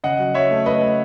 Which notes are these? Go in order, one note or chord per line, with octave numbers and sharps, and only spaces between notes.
C#3 D#5 F#5
F#3
F#3 C#5 E5
A3
A3 B4 D#5
A3